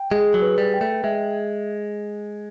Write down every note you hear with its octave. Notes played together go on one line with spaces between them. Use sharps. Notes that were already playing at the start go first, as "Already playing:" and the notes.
Already playing: G5
G#3 G#4
F#3
B4
G3
G5
A3
G#3 E5